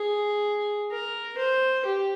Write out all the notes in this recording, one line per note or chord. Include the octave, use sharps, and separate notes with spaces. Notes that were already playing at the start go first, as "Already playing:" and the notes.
Already playing: G#4
A#4
C5
G4